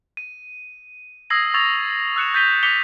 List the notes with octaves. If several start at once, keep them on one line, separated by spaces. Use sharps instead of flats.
D#7
D#6 E6 G#6 A#6 C7 F#7
C#6 E6 G#6 A6 F7
E6 F#6 C#7 E7
G6 A6 B6 D#7 F7 G7
D6 B6 C#7 F7 G7